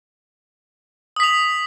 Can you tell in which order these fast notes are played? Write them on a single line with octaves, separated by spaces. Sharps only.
D#6 B6 F7